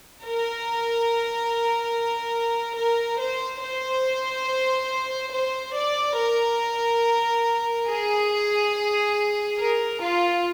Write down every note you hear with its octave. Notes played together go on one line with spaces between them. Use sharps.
A#4
A#4
C5
C5
C5
D5
A#4
G#4
A#4
F4